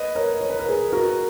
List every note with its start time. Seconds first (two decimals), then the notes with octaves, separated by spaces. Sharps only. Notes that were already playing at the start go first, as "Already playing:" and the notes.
Already playing: B4 D#5
0.15 A#4 C#5
0.41 C#5
0.50 B4
0.59 A#4
0.68 G#4 B4
0.93 F#4 A#4